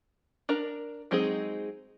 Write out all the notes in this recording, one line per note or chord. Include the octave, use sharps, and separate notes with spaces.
D4 A#4 A#5
F#3 G#3 C4 D#4 G#4